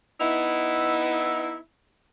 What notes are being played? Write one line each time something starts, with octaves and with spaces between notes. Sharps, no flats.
B3 D#4 E4